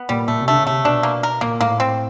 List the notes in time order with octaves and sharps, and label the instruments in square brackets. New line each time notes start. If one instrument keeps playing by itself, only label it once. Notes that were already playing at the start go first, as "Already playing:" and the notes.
Already playing: [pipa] B3
[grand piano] A#2 [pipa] G3
[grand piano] A#2 [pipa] A3
[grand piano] C3
[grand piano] D3 [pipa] A3
[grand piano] C#3
[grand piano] C3 [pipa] A3
[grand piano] B2 [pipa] D4
[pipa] A#3
A#4
[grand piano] A#2 [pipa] A#3
[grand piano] A2 [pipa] A#3
[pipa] C4